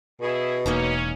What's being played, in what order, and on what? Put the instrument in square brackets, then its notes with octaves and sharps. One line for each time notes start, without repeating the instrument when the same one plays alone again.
[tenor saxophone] B2 [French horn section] E4 G#4
[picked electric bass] E1 [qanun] A#3 D#4 A#5 [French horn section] C#4